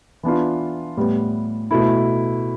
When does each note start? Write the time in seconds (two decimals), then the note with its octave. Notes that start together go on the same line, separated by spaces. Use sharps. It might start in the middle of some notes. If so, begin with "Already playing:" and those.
0.23 E3 B3 D4 F4
0.97 A2 G3 B3
1.71 B2 A3 E4